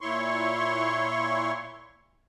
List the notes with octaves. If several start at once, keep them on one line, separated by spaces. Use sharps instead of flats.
A#2 E4 C#5 C6 C#6